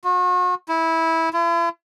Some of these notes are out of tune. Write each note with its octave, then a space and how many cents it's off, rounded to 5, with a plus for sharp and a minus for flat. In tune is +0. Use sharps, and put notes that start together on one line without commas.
F#4 -40
E4 -15
E4 +45